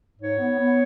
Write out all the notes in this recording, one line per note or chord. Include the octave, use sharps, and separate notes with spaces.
G#2 C#5
B3
B3